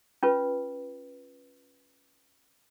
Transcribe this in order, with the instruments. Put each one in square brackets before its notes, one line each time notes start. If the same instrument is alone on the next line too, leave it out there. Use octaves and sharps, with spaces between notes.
[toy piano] C#4 F4 B4